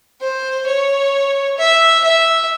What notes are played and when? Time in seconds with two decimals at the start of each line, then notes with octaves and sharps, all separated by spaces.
0.21 C5
0.66 C#5
1.58 E5
2.04 E5